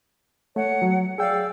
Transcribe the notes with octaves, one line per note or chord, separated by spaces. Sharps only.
A3 C#5 F#5
F#3
G#4 D5 F5 G5 E6